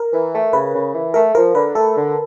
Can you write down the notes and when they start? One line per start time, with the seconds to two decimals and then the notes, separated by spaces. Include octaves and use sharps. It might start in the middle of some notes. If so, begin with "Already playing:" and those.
Already playing: A#4
0.12 E3
0.33 A3
0.53 C#3 B4
0.74 C#3
0.94 E3
1.14 A3 A#4
1.35 F3 A#4
1.55 D3 B4
1.75 A3 A4
1.96 D3